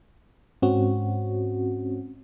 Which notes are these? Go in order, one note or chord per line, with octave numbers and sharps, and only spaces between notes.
G#2 C4 C#4 F#4